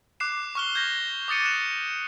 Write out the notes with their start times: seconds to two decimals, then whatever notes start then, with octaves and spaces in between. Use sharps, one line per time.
0.20 D6 F#6 C7 E7
0.55 C#6 F6 G7
0.75 G6 G#6 A#6
1.28 D6 D#6 A6 C#7 D#7
1.45 F#6 E7